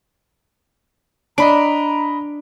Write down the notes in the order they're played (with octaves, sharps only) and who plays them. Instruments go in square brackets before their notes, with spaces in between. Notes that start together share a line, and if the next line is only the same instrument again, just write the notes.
[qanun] D4 [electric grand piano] D#5 B5 D7 [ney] A#5